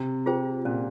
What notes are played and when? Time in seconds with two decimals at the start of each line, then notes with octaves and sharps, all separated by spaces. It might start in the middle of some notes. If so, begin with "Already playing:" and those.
Already playing: C3
0.26 F4 G#4 C5 G5
0.65 A#2 C#4